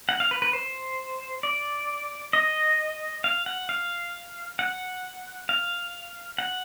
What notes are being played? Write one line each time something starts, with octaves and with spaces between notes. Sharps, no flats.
F#5
F5
B4
B4
C5
D5
D#5
F5
F#5
F5
F#5
F5
F#5